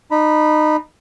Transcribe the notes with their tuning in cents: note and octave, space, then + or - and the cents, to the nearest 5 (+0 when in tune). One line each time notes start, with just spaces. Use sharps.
D#4 -30 B5 -15